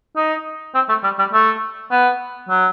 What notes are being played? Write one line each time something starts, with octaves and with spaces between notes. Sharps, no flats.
D#4
C4
A3
G3
G3
A3
B3
F#3